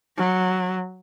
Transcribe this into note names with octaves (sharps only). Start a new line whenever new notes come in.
F#3